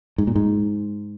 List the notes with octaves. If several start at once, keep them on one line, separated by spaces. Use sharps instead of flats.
G#2
A#2
G#2